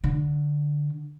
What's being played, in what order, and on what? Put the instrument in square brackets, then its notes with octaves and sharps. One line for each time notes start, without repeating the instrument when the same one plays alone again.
[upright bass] D3